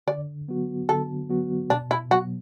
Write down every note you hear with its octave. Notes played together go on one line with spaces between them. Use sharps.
D3 D5
F#3 B3 F#4
D3 A4
F#3 B3 F#4
B2 D4
E4
F#3 B3 F#4